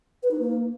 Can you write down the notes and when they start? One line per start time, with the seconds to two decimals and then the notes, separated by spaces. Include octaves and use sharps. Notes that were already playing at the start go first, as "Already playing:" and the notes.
0.23 B4
0.31 D#4
0.39 A#3